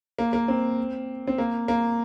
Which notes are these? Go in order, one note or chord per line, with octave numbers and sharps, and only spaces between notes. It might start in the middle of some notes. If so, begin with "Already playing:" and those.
A#3
A#3
C4
C4
A#3
A#3